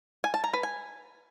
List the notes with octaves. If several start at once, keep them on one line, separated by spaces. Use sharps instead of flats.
G#5
A5
A#5
B4
G#5